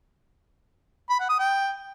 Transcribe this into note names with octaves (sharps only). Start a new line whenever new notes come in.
B5
F#5
D#6
G5